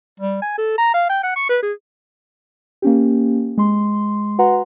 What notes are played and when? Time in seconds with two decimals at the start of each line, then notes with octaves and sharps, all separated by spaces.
0.20 G3
0.42 G#5
0.58 A4
0.78 A#5
0.94 F5
1.09 G5
1.23 F#5
1.36 C#6
1.49 B4
1.63 G#4
2.82 A#3 C#4 G4
3.58 G#3 C6
4.38 F#4 B4 F#5 A#5 C6